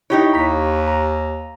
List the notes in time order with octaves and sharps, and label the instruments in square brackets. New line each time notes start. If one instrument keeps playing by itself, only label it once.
[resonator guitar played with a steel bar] D#4 G4 C#5 [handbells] E4
[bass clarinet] D#2 [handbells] A#5 B6
[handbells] A#5